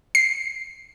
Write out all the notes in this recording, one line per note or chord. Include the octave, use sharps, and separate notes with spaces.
C7